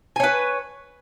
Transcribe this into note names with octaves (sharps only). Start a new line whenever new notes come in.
B4 C#5 G#5